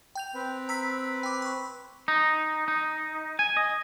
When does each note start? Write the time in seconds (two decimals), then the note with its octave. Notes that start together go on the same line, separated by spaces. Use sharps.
0.15 G5 G6 F7
0.35 C4 B4
0.69 A#5 E6 B6
1.23 G5 D6
1.42 B5 C#6
2.08 D#4
2.68 D#4
3.39 G#5
3.57 D#5